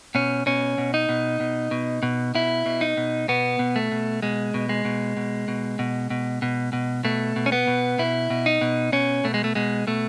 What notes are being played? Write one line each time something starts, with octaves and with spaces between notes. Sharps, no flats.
B2 C#4
B2 C#4
B2
D#4
B2
B2
B2
B2
B2 E4
B2
D#4
B2
B2 B3
B2
A3
B2
B2 G#3
B2
G#3
B2
B2
B2
B2
B2
B2
B2
B2 A3
B2
C#4
B3
B2
B2 E4
B2
D#4
B2
B2 C#4
B2 A3
G#3
A3
B2 G#3
B2 A3